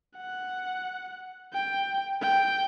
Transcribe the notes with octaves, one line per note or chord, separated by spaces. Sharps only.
F#5
G5
G5